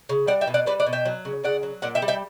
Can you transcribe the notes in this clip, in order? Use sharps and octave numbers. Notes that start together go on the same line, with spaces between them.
C#3
G3 D5 F#5
E5 G5
B2
D5 F#5
G3 B4 D5
D5 F#5
B2
E5 G5
F#3
C#3
C#3 D5 F#5
F#3
A#2 D5 F#5
E5 G5
G3
E5 G5